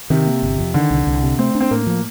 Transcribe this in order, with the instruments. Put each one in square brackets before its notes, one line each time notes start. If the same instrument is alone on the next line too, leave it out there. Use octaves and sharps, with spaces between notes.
[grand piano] C3 [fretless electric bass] D#3
[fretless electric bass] A#3
G1
F2
[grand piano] D3 [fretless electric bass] D#3
[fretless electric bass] C2
C2
C3
[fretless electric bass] A3 [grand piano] C4
[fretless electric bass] D4
[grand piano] C4
[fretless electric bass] A2 [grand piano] A#3
[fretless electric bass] F3